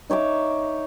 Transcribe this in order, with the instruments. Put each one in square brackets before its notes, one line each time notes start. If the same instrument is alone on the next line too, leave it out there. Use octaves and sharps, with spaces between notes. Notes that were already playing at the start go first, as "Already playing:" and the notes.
[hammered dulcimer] D#4 C#5 E5 D6